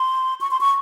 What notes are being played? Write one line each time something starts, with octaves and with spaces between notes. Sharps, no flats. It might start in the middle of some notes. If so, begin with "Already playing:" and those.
Already playing: C6
C#6
C6
C#6